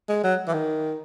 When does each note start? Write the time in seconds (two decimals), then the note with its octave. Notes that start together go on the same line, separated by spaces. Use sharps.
0.09 G#3
0.24 F#3
0.48 E3
0.54 D#3